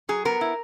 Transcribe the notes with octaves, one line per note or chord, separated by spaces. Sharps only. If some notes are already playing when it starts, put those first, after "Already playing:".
F#3 G#4
B3 A#4
E4